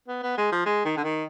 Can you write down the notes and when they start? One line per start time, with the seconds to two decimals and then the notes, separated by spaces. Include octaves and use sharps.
0.08 B3
0.23 B3
0.38 G#3
0.52 F3
0.66 G#3
0.85 D#3
0.97 D3
1.04 D#3